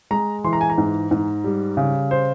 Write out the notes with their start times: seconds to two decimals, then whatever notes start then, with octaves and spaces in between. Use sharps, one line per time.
0.11 G#3 A#5
0.44 E3 C6
0.53 A#5
0.61 G#5
0.70 A#5
0.78 G#2
1.11 G#2
1.44 G3
1.77 C#3
2.11 C5